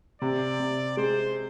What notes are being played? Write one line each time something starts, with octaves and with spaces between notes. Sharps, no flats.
C3 D5
C3
G#3 C5